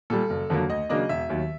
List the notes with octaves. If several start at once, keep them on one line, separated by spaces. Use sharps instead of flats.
A#2 G3 A4
F#1
F2 D3 F#3 A#3
D2 D#5
C#3 F#3 A#3 D4 D#5
E1 E5
D#2 D#3 F#3